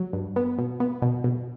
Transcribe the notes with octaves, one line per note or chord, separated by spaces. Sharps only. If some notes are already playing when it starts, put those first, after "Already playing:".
Already playing: F#3
G2
B3
B2
B3
B2
B2